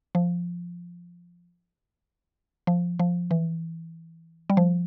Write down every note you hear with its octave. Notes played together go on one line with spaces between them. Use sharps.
F3
F3
F3
E3
G3
F3